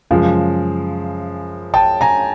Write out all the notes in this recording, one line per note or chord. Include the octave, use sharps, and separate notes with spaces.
F#2 C#3 F3 G#3
G5 A5
G#5 A#5